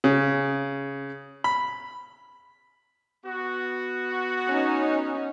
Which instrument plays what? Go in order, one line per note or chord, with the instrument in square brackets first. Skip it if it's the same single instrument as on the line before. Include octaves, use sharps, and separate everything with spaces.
[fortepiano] C#3
B5
[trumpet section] B3 F#4
[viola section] C#4 D#4